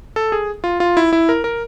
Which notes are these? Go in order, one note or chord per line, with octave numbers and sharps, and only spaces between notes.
A4
G#4
F4
F4
E4
E4
A#4
A#4